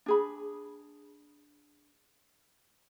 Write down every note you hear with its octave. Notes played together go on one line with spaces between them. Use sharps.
D4 G#4 B5